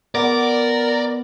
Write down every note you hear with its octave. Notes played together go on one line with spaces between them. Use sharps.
B3 A#4 D5